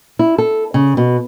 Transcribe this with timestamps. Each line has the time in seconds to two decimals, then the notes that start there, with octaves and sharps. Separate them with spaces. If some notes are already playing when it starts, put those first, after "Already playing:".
0.19 E4
0.38 A4
0.74 C#3
0.97 B2